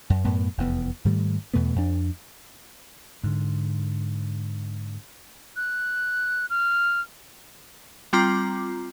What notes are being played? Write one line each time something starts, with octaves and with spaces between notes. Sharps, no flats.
F#2
F#2 A2 B3
F1 E2 B3
G#2 D#3 G3 A3
E2 B2 A3 B3
F2 D4
G#2 D3
F#6
F6
G3 C4 F4 A#5 D6